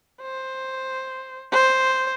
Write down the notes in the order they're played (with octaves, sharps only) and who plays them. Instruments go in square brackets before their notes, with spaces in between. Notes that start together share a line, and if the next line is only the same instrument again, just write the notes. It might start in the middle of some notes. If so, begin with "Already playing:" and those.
[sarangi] C5
C5